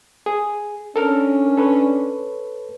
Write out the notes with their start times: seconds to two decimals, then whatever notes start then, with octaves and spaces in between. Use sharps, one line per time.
0.26 G#4
0.96 C#4 D4 A4 A#4 F6
1.57 A4 B4 C#5